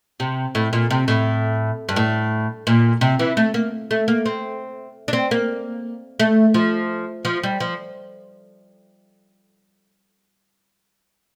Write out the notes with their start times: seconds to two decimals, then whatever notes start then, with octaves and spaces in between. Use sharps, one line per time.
0.20 C3
0.55 A2
0.73 A#2
0.90 C3
1.08 A2
1.89 G2
1.96 A2
2.67 A#2
3.01 C3
3.19 E3
3.37 A3
3.54 A#3
3.91 A3
4.08 A#3
4.26 C4
5.08 D4
5.13 C4
5.31 A#3
6.20 A3
6.54 F3
7.25 F3
7.43 G3
7.60 F3